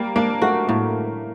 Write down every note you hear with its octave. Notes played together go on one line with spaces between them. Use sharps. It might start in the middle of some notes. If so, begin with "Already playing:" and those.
Already playing: G3 A#3
A#3 D4
A3 F#4
A2 A#3